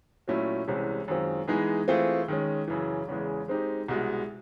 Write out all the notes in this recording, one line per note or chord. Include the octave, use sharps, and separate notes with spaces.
A#2 F#3 A3 C#4 E4
C2 C3 E3 G#3 C#4
F#2 D#3 G#3 C4 F4
E3 G#3 B3 D#4 G#4
E3 A3 C4 F4 G#4
D#3 G#3 C#4
F#2 C#3 E3
E2 C#3 E3 G#3
G#3 C4 D#4 G4
C2 B2 G#3